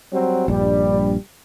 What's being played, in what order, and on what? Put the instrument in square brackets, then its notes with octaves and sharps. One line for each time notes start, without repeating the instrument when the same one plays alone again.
[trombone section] F#3 G3 C4
[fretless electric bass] A#1 G2 [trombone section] G3